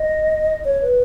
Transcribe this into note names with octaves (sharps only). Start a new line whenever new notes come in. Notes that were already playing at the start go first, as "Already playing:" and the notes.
Already playing: D#5
C#5
B4